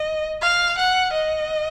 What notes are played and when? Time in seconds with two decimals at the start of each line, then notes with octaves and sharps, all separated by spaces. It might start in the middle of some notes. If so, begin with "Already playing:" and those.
Already playing: D#5
0.41 F5
0.78 F#5
1.13 D#5